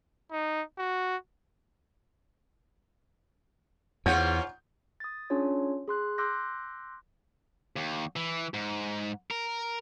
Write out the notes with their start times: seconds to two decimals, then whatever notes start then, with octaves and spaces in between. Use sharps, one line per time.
0.32 D#4
0.78 F#4
4.06 E2 G#2 F4 C#5 F#5 G6
5.00 D#6 A6
5.30 C#4 D4 F4 G#4 C#5
5.88 G#4 C6 F#6
6.18 C6 D6 E6 F#6 G6 A#6
7.76 D#2
8.16 E3
8.54 G#2
9.31 A#4